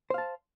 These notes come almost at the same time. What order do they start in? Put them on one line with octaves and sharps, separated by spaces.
C5 F5 A5